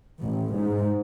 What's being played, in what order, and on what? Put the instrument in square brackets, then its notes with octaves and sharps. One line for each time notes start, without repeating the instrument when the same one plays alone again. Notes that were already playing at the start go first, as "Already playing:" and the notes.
[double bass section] A1
G#2